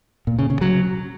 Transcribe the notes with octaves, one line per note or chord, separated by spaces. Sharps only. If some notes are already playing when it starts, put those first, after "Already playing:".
A#2
C#3
C#3
F#3